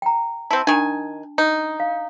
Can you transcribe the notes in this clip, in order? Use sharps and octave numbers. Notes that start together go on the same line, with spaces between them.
G5 A#5
C4 E4 A5
D#3 D4 G#5
D#4
F5